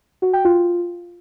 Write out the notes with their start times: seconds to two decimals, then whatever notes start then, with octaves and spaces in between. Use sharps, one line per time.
0.22 F#4
0.33 G5
0.45 F4